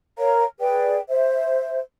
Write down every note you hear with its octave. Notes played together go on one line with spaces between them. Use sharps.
A#4 C#5 F5 A#5
G#4 B4 D5 G5
C5 E5